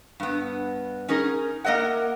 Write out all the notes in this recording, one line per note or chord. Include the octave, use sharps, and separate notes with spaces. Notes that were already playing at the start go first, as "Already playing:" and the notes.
G2 B3
C#4 D#4 G#4 A#4
A#3 A#4 D#5 E5 F#5